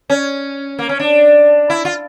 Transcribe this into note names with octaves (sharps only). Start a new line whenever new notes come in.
C#4
A#3
C#4
D4
E4
F4